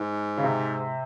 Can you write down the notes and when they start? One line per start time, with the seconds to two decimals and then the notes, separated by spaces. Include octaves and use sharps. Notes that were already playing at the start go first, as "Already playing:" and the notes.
Already playing: G#2
0.37 C#3
0.44 C3